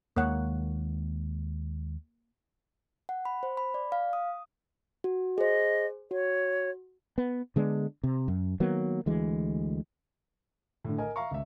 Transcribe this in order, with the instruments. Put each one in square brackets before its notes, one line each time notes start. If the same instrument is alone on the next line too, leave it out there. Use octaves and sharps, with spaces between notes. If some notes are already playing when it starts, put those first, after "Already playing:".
[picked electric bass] D#2 D#3 G#3 [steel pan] A#3 C#5 F#5
[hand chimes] F#5
B5
C5
B5
D5
F5
D#6
F#4
[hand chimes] G#4 C5 [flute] D#5
[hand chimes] F#4 [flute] C#5
[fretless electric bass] B3
D3 G#3 B3 D4
C3
F#2
D#3 F#3 A#3 B3
D2 E3 G#3
[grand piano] A2 D3
A#4 D#5 G#5
E5 F5 A#5 C#6
C#2 E5